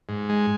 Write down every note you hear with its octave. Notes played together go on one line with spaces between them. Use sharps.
G#2
G#3